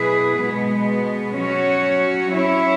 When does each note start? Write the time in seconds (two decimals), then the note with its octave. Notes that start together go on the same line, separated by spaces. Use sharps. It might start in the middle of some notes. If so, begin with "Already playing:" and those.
Already playing: B2 F#3 E4 G#4 B4
0.39 B2 G#3 B3
1.36 F#3 C#4 F#4 C#5
2.31 F#3 C#4 E4 C#5